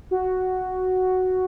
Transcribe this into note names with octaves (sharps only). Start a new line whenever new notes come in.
F#4